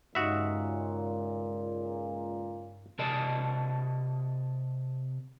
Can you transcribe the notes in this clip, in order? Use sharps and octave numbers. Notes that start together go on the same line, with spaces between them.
C#2 G2 A#2 D#4 F#4 D#5 E5
C3 A#4 D5 D#5 A5